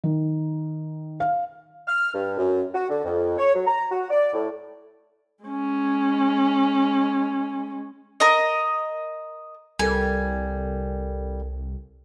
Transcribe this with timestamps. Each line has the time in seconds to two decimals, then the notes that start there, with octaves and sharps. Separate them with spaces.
0.04 D#3
1.20 F5
1.88 F6
2.14 G2
2.37 F#2
2.74 F#4
2.89 D3
3.04 F2
3.38 C#5
3.55 F#3
3.67 A#5
3.91 F#4
4.10 D5
4.33 A2
5.44 G#3 C#4
8.20 A#4 D#5
9.79 C2 G3 A4 A#4 G#5